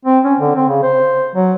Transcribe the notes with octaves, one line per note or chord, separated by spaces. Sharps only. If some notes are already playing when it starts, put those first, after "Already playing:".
C4
C#4
D3
C4
C#3
C5
F#3